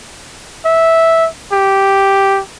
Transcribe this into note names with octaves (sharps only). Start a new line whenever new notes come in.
E5
G4